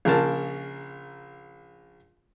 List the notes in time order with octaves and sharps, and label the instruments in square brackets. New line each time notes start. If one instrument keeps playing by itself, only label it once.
[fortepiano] A#1 C#3 A#4 A5